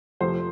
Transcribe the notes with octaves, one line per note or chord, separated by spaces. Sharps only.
F2 C3 F3 A3 C5